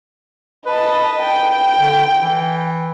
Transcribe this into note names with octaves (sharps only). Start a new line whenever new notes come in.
B4 D#5 A5
G5
D3
E3